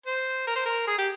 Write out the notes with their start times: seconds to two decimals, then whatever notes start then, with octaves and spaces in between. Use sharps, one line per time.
0.06 C5
0.47 A#4
0.56 C5
0.65 A#4
0.87 G#4
0.98 G4